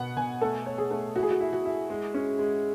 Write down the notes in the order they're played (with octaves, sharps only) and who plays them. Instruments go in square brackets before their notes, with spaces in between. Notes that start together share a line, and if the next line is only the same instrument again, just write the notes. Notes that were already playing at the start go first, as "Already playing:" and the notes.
Already playing: [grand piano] B2 B3 [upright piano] F#5
[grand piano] B2 [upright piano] G#5
[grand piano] A3 [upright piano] A4
[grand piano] C#5
[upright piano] G#4
[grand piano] A3
[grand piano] E4 [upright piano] F#4
[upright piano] G#4
F#4
[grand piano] E4
[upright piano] F#4
[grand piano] E4
G#3
C#4
G#3